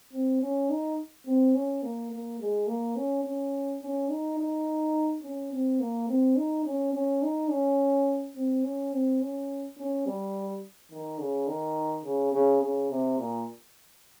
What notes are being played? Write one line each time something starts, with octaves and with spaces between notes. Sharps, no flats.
C4
C#4
D#4
C4
C#4
A#3
A#3
G#3
A#3
C#4
C#4
C#4
D#4
D#4
C#4
C4
A#3
C4
D#4
C#4
C#4
D#4
C#4
C4
C#4
C4
C#4
C#4
G3
D#3
C#3
D#3
C#3
C#3
C#3
C3
A#2